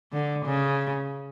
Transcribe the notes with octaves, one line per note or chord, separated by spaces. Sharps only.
D3
C#3